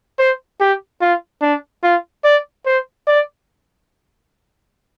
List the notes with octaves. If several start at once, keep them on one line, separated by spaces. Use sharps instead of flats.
C5
G4
F4
D4
F4
D5
C5
D5